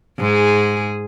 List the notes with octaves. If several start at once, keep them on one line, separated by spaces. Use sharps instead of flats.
G#2 G#4